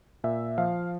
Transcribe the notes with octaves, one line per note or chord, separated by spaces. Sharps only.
A#2 E5
F3 F5